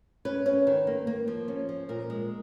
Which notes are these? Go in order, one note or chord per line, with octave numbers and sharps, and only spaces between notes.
C#4 B4
C#4
D#3
A#3
A#3
F3
C#4
F3
A#2 A#4
G#3